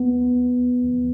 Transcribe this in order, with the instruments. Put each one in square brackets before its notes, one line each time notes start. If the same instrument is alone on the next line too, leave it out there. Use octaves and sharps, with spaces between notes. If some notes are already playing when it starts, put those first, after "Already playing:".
Already playing: [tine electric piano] B3